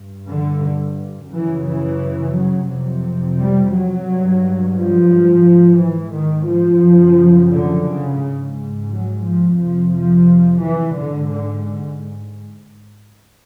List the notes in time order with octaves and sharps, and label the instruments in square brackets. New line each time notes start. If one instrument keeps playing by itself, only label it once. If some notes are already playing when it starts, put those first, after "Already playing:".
Already playing: [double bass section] G2
D3
F#2 C#3 E3
E3
F#3
F2 C3
G3
F#3
G2
F3
G#2
E3
D#3
F3
F#2 C#3
D3
C#3
G#2
F#3
F3
F2 C3 F3
F3
E3
G#2 D3
D3